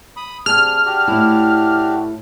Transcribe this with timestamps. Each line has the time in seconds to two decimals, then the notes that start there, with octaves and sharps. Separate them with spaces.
0.17 B5 D#6
0.46 C3 D4 G#4 F6
0.86 D4 F#4 G4
1.08 A2 E4